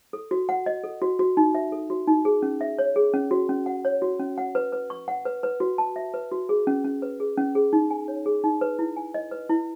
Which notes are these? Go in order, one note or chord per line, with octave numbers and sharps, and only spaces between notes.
A4
F#4
F#5
D#5
A4
F#4
F#4
D#4
E5
A4
F#4
D#4
G#4
C#4
E5
C#5
G#4
C#4
F#4
C#4
F#5
C#5
F#4
C#4
F#5
B4
B4
C#6
F#5
B4
B4
F#4
A5
E5
B4
F#4
G#4
C#4
C#4
B4
G#4
C#4
G#4
D#4
G#5
C#5
G#4
D#4
B4
E4
G#5
D#5
B4
E4